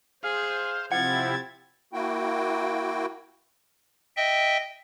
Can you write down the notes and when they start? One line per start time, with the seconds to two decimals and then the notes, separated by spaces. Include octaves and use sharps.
0.23 G#4 C5 F5
0.92 C3 F3 C4 E4 F#5 G#6 A6
1.93 A#3 E4 F#4 G5
4.17 D#5 E5 G5